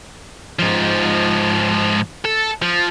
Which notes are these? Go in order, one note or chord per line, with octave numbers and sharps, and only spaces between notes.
G#2 F3
A4
F3